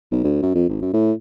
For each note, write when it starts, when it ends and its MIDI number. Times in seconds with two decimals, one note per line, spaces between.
0.12 0.23 35
0.24 0.38 38
0.42 0.51 42
0.55 0.69 41
0.69 0.79 32
0.82 0.89 42
0.94 1.12 45